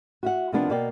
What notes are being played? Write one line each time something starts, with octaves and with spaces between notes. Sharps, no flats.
F#4 E5 F#5
C3 D#3 F3 A#3 B3 D4
B2 A#3 D5 G5